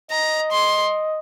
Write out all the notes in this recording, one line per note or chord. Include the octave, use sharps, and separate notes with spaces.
D#5 A#5
C6